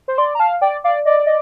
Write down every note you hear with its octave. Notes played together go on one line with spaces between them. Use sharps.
C5
D5 C6
A#5
F5 A5
D5 G5
D5 F5
D5 D#5
D#5